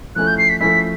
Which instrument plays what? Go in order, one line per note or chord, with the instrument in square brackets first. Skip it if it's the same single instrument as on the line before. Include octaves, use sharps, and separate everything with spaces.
[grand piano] F3 A3 C#4 E4 [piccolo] F#6
[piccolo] G6
C7
B6
[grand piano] F3 A3 C#4 E4 [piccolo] B6